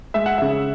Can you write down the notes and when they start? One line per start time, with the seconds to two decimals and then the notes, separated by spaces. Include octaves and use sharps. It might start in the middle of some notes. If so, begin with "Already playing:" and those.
0.14 G#3 E5
0.26 F#5
0.38 C#3 E5